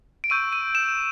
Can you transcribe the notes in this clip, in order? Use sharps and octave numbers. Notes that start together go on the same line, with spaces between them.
D7
C#6 E6 G6 D#7
D#7
E7